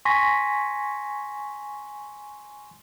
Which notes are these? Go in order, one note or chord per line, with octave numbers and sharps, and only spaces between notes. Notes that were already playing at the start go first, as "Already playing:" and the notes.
G#5 C6 C#6 A#6 B6